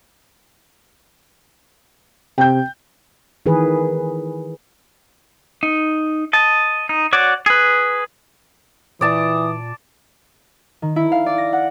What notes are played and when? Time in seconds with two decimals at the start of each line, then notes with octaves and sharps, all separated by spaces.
2.38 C3 G5 G6
3.46 D#3 E3 G#4 B4
5.63 D#4
6.33 D#5 A5
6.89 D#4
7.13 F#4 C#5 D5 D6
7.46 G#4 B4
9.01 A#2 E3 D5 A5 D#6
10.82 D#3
10.96 E4
11.12 F5
11.26 D5
11.38 A#6
11.53 F#5